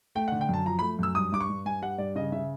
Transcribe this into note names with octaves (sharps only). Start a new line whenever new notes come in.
A3 G5
F#5
D3
G5
F#2 A5
F3 A#5
A3 B5
F#2 E6
G2 D#6
G2 D6
C#6
G2
G2 G#5
G3 F#5
G2 D5
C#3 D#5
C#3 E5